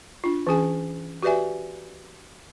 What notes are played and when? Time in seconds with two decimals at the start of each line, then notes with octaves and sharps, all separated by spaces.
0.24 D4 F4
0.47 E3 C#4 G#4 G#5
1.23 F#4 G4 B4 D5 E5 G#5